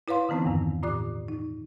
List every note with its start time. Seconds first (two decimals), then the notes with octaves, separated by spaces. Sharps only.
0.08 E4 B4 C#5 F5 C6
0.29 D3 E3 B3 C4 D#4
0.45 E2 G2 D#3
0.83 A2 F4 D5 D6 F#6
1.28 D#4